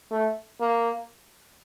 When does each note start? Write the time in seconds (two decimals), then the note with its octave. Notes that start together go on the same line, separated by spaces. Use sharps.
0.11 A3
0.60 A#3